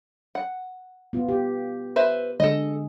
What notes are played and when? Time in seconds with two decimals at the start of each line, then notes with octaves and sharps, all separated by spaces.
0.35 F#5
1.13 B3 F4
1.29 G4
1.96 B4 C5 E5
2.40 D3 G#3 A4 D#5